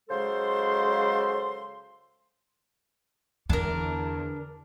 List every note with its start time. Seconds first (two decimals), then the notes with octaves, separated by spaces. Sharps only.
0.09 C#3 F#3 G#3 A4 C5 C6
3.50 E2 D3 D4 A#4